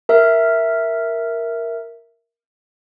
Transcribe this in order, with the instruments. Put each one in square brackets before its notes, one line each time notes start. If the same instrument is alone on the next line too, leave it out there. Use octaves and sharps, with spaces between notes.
[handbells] A#4 E5